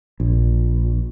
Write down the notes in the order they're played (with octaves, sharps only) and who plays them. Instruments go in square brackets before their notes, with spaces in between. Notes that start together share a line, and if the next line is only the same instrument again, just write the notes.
[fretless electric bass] A#1